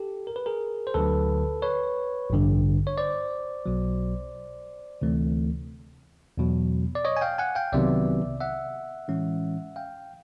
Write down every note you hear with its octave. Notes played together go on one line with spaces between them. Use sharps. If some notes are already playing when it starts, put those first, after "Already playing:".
Already playing: G4 A4
A#4
B4
G#4 A#4
C5
D2 D3 F#3 A4 B4
B4 C#5
A1 G2 D3
C#5
C5 D5
B1 B2 F#3
D2 C3 E3 A3 C4
E2 B2 F#3
D5
C#5 D#5
G#5
F5 G5
F#5 G#5
F5 G5
C2 C3 D#3 F#3 B3 D5 E5
E5 F#5
A2 E3 G#3 C#4
F5 G5